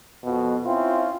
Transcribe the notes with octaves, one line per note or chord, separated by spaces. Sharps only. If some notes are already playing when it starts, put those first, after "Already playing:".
F2 B2
C4 C#4 E4 F4